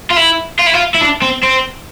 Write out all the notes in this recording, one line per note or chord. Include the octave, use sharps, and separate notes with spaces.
F4
E4
F4
E4
F4
E4
D4
C4
C4